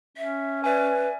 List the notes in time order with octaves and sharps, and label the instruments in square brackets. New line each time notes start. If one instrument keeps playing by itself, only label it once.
[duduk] C#4 [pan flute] E5
[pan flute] B4 [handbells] D5 E5 G#5